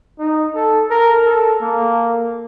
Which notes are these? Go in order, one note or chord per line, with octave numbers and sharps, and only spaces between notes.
D#4
A4
A#4
A4
A#3